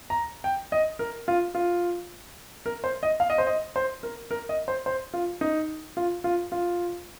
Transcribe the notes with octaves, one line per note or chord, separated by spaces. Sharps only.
A#5
G5
D#5
A#4
F4
F4
A#4
C5
D#5
F5
D#5
C5
D#5
C5
A#4
A#4
D#5
C5
C5
F4
D#4
F4
F4
F4